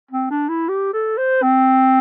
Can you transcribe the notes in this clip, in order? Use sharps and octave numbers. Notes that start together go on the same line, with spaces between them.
C4
D4
E4
G4
A4
C5
C4